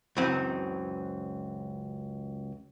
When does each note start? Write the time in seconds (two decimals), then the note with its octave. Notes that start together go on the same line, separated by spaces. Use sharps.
0.17 C#2 F#2 E3 F#3 C4 D#4